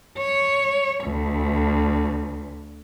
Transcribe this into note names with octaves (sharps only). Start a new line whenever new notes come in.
C#5
D2